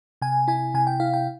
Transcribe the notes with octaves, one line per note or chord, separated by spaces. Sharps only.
C3 G#5
E4 G#5
C3 G#5
G5
E4 F5
G5